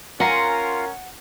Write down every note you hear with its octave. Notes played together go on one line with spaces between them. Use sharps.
C#4 F4 A#4 F5 F#5 G#5 A#5 C6